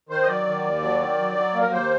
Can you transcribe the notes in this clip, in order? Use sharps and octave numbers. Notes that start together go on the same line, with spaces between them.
D#3 C5
D#5
F#3 D5
D#3
D#2
F#3
D#3
F#3
F#3
A#3
A#4
D#2 C5